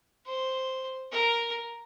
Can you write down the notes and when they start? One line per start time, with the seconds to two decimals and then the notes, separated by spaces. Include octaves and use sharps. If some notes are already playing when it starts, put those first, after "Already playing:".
0.26 C5
1.12 A#4